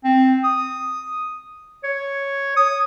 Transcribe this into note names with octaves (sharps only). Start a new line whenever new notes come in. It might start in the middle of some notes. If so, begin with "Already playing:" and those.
C4
D#6
C#5
D#6